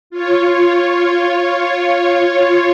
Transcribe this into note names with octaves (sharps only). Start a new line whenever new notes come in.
F4 C#5